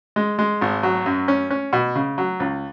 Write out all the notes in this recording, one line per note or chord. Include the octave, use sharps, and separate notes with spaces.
G#3
G#3
G#1
F#3
F#2
C#4
C#4
B2
C#3
F#3
C#2